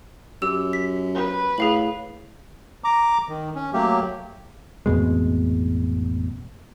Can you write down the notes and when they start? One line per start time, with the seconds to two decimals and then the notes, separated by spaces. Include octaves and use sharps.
0.42 F#2 G4 E6
0.73 B6
1.14 B4
1.58 A2 G#4 F5 F#7
2.84 A#5 D6
3.28 D#3
3.55 C#4
3.73 F#3 A3 A#3 G4
4.86 A1 F2 B2 G#3